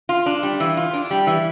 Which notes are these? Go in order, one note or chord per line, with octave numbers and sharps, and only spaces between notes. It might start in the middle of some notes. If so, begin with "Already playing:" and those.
F4
D4
G3
E3
F4
D4
G3
E3